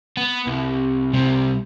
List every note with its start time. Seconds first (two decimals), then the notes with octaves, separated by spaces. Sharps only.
0.17 B3
0.47 C2
1.13 C2 C3